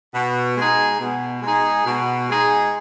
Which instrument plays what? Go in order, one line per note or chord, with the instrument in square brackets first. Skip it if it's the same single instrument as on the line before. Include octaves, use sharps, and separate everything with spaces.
[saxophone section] B2
G#3 D#4 G#4
B2
G#3 D#4 G#4
B2
G#3 D#4 G#4